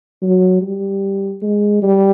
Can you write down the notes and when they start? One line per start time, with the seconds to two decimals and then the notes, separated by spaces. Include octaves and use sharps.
0.22 F#3
0.62 G3
1.42 G#3
1.83 G3